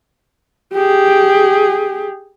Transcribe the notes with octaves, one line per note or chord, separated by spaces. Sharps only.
G4 G#4